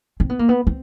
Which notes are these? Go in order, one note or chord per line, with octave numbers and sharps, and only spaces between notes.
C4
B3
A#3
B3
C4